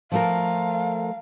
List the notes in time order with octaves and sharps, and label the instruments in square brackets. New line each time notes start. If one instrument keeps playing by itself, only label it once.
[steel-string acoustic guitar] F3 A3 A#4 [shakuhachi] F5